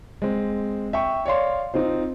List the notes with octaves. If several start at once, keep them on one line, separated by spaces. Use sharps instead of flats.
G#3 C4
E5 G5 C#6
C#5 D5 F5 C6
C4 D#4 F4 C5